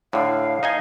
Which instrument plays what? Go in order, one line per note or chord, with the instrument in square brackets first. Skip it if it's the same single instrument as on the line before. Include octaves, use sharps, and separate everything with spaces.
[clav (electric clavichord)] A2 D3 [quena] F5
[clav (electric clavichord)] D#4 D#5 G#5 [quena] F5